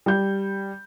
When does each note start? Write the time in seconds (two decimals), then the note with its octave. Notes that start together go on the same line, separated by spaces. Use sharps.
0.06 G3 G6